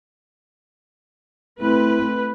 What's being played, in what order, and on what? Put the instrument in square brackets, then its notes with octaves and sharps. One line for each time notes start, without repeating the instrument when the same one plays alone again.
[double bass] A3 C4 [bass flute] E4 [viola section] B4